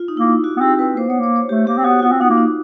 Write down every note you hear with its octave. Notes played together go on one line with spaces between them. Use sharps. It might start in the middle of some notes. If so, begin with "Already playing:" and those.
Already playing: F4
D#4
A#3 E4
F#4
B3
C4 G4
C4 B4
A#3 C5
B3 C#5
A#3 C#5
C#5
A3 G4
A#3 G4
C4
B3 F#4
F#4
B3 F4
C4
B3 D#4
A#3
D#4